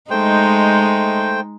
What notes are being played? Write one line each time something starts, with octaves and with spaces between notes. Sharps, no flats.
G#3 A3 D#4 C5 G5